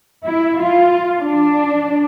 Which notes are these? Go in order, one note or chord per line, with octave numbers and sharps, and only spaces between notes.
E4
F4
D4